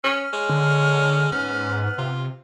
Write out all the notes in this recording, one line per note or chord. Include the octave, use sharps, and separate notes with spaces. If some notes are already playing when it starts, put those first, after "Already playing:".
C#4 F6
G#3 C#5
D3
G#2 B3 C#4
C3 F4